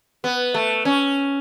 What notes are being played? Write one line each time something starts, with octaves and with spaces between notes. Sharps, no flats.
B3
A3
C#4